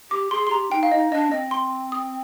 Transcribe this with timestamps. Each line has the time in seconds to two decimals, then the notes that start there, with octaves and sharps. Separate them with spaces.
0.11 G4 D6
0.31 G#4 C6
0.47 C6
0.51 G4 A#5
0.71 D#4 G5
0.83 F5
0.92 D#4 D#5
1.11 D4 D#5
1.31 C4 D#5
1.51 C6
1.92 D#6